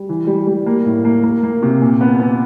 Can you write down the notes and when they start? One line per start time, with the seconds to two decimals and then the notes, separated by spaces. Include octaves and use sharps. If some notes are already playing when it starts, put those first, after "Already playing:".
Already playing: G3
0.09 E3
0.27 G3
0.47 G3
0.66 A#3
0.86 A2
1.05 A#3
1.23 A#3
1.43 A#3
1.62 C3
1.81 A#2
2.01 B3
2.20 B3